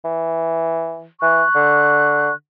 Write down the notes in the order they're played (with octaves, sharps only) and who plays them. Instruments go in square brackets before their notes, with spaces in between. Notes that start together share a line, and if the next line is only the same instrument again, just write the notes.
[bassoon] E3
[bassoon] E3 [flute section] C#6 F#6
[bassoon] D3